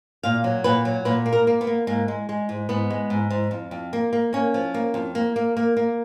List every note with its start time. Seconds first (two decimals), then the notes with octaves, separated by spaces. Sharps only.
0.23 A#2 F5
0.44 F#3
0.64 A#2 B4
0.85 F#3
1.05 A#2 B4
1.26 A#3
1.33 A#4
1.47 A#3
1.61 B3
1.67 A#3
1.87 G#2 A#3
2.08 G#3
2.29 G#3
2.49 G#2
2.69 G#2 B3
2.90 G#3
3.10 G#2
3.30 G#2
3.51 F2
3.71 F2
3.93 A#3
4.13 A#3
4.33 A#3 C#4
4.54 F3
4.74 A#3
4.94 F2
5.15 A#3
5.36 A#3
5.57 A#3
5.77 A#3